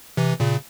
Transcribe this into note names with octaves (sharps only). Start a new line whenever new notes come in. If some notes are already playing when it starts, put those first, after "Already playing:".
C3 E3
A#2 C#3